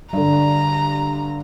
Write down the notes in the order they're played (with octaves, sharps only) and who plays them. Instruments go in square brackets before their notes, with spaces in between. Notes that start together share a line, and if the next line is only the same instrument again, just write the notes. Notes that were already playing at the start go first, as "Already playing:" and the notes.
[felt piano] G2 D3 [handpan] G3 [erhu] A#5